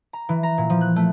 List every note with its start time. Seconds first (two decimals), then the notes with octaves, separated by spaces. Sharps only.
0.13 A#5
0.29 E3
0.43 A#5
0.58 A#2
0.70 F3
0.81 F#6
0.96 A3